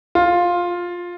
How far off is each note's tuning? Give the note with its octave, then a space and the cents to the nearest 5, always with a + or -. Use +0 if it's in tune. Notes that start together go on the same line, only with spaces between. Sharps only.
F4 +10